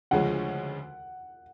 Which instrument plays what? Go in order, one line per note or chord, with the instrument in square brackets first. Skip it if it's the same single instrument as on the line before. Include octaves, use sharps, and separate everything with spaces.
[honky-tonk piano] D2 C#3 F3 G#3 C#4 [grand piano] F#5